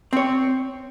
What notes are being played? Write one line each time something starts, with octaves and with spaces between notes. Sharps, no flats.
C4 C#5